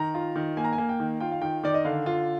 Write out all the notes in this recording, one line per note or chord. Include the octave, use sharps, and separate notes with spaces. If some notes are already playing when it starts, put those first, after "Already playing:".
Already playing: D#3 A#5
F4
D#3
A#3 G#5
A#5
G#5
A#3
G5
D#3
F4 G5
F5
D#3 G5
D#3 D5
D#5
D3 F5
F4